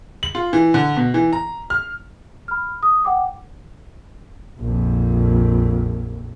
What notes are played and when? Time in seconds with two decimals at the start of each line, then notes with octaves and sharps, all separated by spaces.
0.23 F#7
0.35 F4
0.53 E3
0.74 D3
0.97 B2
1.14 E3
1.33 A#5
1.70 F6
2.48 B5 F6
2.83 D#6
3.05 F#5 G5 D6
4.60 A#1 F2